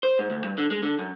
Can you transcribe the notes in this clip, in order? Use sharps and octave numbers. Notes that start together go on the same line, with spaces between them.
C5
G#2
D2
G2
D3
G#3
D3
F#2